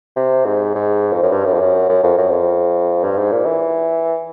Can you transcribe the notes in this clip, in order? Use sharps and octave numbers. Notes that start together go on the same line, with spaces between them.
C3
G#2
G#2
F2
F#2
G2
F#2
F2
F#2
F#2
F2
F#2
F2
G2
G#2
A#2
E3